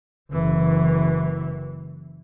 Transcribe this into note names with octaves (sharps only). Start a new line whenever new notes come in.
F#1 E3